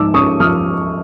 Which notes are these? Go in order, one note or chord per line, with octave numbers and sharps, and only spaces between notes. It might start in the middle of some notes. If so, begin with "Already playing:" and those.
Already playing: G#2 F3 D6 E6
C#4 C#6 D#6
F3 D#6 F6